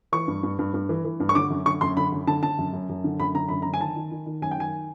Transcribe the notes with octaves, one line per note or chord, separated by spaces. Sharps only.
E3 C#6
G2
G2
G2
G2
E3
E3
G2
C#6
D3 D6
F#2
D3 C#6
F#2 C6
D3 B5
F#2
D3 A5
D3 A5
F#2
F#2
F#2
D3
F#2 B5
D3 A#5
F#2 B5
A#5
D3
G#5
D#3 A5
D#3
D#3
D#3
F#2 G#5
G5
D#3 G#5